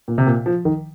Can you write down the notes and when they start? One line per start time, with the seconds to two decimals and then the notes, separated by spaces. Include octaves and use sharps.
0.08 A#2
0.18 C3
0.27 A#2
0.46 F3
0.65 D#3